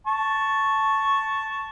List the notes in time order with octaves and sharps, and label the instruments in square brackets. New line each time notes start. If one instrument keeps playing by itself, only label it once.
[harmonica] A5 C#6